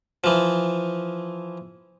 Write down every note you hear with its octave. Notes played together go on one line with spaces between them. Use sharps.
E3 F3